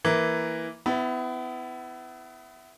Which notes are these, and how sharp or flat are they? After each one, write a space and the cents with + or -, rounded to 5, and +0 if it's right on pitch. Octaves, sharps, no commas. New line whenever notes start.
E3 +0 A#3 +0 E4 +0
B3 +30 E4 +0